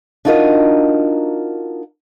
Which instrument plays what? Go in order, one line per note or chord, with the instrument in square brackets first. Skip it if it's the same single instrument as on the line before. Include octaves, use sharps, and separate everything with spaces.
[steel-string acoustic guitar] D4 D#4 F4 F#4 A#4 D#5